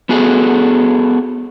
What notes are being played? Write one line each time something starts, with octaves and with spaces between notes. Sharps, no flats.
B3 F#4 G#4 A4